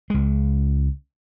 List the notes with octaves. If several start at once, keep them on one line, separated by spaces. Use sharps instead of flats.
C#2 G#3